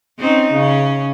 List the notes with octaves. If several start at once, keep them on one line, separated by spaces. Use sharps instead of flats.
C4 C#4 D#4
C#3 C#4